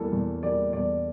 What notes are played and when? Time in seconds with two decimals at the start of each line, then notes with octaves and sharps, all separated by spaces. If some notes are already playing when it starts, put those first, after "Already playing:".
Already playing: E2 E3 G3 A#3 A4
0.13 E2
0.43 E3 G3 A#3 D5
0.73 E2 D5